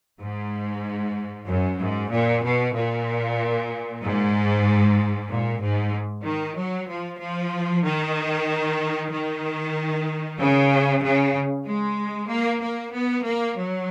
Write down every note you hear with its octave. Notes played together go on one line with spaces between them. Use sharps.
G#2
F#2
G#2
A#2
B2
A#2
G#2
A#2
G#2
D#3
F#3
F3
F3
D#3
D#3
C#3
C#3
G#3
A#3
A#3
B3
A#3
F#3